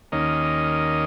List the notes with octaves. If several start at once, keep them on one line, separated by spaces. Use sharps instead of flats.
D#2 D#3 A#3 C#4 D#5